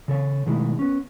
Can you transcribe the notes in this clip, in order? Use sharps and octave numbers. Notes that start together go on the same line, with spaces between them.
C#3 A4 C#5
B2 D#3 G#3 A3 E4
B3 C#4